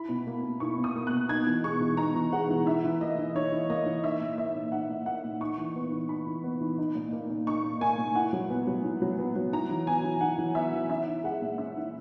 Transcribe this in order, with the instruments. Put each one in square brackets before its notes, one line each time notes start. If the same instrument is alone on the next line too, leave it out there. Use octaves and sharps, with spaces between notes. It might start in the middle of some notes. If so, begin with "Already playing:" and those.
Already playing: [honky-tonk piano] E4 B5
B2
A#3
B2
E4 C#6
B2
D#6
A#3
F#6
B2
D#4 G#6
E3
G#3 C#6
E3
D#4 A#5
E3
G#3 F#5
E3
E4 E5
E3
A#3 D#5
E3
E4 C#5
E3
A#3 D#5
E3
D#4 E5
A#2
A#3 E5
A#2
D#4 F#5
A#2
A#3 F#5
A#2
D#4 C#6
E3
B3
E3
D#4 B5
E3
B3
E3
D#4
A#2
A#3
A#2
D#4 C#6
A#2
A#3 G#5
A#2
E4 F#5
F#3
B3
F#3
E4
F#3
B3
F#3
E4 A#5
E3
B3 G#5
E3
E4 F#5
E3
B3 E5
E3
C#4 E5
E4
G#3 F#5
A#2
C#4 E5
E4